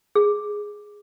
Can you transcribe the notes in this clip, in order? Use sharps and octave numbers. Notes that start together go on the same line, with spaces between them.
G#4